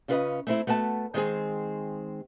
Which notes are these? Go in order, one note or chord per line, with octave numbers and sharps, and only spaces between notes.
C#3 C#4 F4 B4 D5 D#5
A3 C4 E4
A3 B3 F#4 D#5 A5
D#3 G#3 C4 G#4